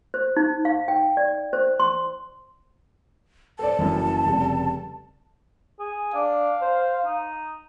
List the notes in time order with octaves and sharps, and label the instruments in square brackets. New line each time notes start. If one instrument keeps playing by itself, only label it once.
[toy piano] C5
D#4
F5
G5
D5
C5
C6
[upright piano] A4 C5 D5 [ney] A5
[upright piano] F#1 F#2 E3
F1 C#3 G3
[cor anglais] G#4
[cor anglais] D4 [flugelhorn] F5
[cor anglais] C5
D#4